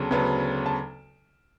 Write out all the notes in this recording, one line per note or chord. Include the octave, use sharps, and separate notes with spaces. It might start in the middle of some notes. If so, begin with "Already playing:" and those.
Already playing: D2 C#3 F#3 B3 A5
D2 C#3 F#3 B3
A5